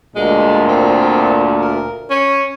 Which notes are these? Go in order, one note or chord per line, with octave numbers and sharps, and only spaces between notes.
D2 A#2 G#3
C4
A#4
C#4